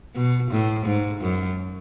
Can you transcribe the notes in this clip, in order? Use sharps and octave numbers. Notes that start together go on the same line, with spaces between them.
B2
A2
G#2
F#2